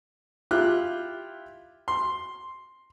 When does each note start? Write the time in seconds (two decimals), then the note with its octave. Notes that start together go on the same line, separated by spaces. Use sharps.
0.51 E4 F4 G4 F#6
1.88 C6